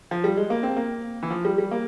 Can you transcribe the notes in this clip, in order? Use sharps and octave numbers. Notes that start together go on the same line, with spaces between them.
F3
G3
G#3
A#3
C4
A#3
E3
F3
G3
G3
A#3